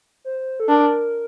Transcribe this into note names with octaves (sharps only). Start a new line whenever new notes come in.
C5
A4
D4 A#4